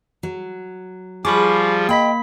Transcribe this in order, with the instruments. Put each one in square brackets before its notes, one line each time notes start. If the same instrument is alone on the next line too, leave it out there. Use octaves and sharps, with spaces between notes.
[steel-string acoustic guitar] F#3
[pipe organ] F3 G3 F4 [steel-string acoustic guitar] G#4 [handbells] B5 C#6 D6
[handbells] A#3 B5 B6 [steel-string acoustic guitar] D#5 G5